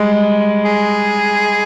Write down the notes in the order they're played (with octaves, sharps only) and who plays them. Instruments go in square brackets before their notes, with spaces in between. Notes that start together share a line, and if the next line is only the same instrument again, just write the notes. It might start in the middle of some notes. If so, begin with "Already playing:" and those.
Already playing: [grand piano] G3 G#3
[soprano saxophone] G#4